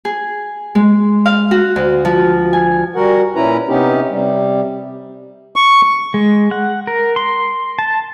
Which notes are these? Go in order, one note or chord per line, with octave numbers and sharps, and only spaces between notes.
G#4
G#3
F5
F#4
D2
F3
G#5
G3 F#4 A#4 F#5
A#2 C#4 E4 B4 A#5
C3 B3 C#4 D#4 G4
C3 G3
C#6
G#3
F#5
A#4
C6
A5